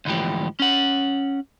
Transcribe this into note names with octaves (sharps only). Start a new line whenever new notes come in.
D2 G#2 E3 F3 G4
C#4 F#5